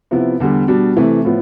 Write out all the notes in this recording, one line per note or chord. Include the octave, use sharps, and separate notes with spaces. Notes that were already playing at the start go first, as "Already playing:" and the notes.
C3 F3 B3 E4
E2 D3 G3
B2 G3 D4
C3 E3 A3
A2 F3 B3